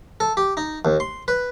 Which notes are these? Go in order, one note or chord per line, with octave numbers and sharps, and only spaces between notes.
A4
G4
D#4
D#2
C6
B4